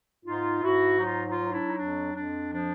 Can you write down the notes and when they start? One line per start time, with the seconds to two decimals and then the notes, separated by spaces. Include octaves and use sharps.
0.25 G#2 D#4 F4
0.62 G#2 E4 F#4
1.00 F#3 D#4 F4
1.25 D#4 F4
1.38 F#3
1.50 D4 E4
1.66 D#4
1.76 F2 D4
2.12 F2 D4
2.51 F3 D4